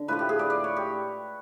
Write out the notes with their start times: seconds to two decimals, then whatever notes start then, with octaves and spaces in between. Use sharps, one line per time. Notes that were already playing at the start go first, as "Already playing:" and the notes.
Already playing: D3
0.08 A2 F3 A3 B4
0.19 G4
0.29 G#4
0.39 D5
0.50 D5
0.64 C#5
0.76 G4